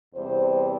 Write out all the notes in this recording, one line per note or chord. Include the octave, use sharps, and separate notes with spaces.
E2 C3 G3 C4 C5